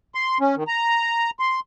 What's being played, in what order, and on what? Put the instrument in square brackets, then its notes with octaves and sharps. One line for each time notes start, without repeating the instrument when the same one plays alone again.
[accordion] C6
C#4
D#3
A#5
C6